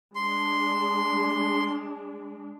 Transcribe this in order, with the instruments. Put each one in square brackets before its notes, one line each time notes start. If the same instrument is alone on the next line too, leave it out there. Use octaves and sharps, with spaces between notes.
[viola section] G#3 D4 [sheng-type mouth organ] C6